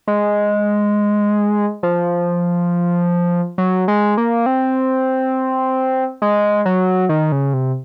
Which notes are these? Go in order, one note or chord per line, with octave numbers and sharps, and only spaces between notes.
G#3
F3
F#3
G#3
A#3
C4
G#3
F#3
D#3
C#3
C3